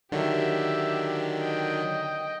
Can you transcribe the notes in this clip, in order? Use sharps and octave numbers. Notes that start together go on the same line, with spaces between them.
D3 D#3 F#3 G4 E5
D#5 G5